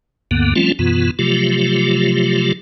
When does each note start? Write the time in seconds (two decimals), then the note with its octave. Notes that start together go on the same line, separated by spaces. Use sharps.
0.31 D2 G2 D3 A#3 B3
0.56 F3 G3 A3 C4 C#4 F4
0.79 F#2 B2 E3 B3 F4
1.19 C3 F3 F#3 A3 F4 G4